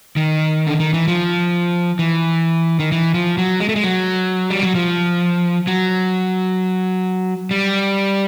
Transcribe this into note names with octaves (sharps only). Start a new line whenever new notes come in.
D#3
D3
D#3
E3
F3
E3
D#3
E3
F3
F#3
G#3
A3
G#3
F#3
G3
F#3
F3
F#3
G3